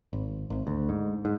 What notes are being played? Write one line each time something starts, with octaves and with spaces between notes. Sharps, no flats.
G#1
G#1
D2
G#2
G#2